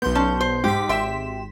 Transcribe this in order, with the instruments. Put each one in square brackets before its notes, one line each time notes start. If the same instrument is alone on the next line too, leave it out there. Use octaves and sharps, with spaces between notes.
[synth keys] B1 C6 G6 [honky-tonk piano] B3
[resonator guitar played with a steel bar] C#4 [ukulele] A5
[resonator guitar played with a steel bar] C5
[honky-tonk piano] G#2 [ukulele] G4 [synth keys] D6 B6
[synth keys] G#1 B6 E7 [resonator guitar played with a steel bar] E5 G5 [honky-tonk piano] C6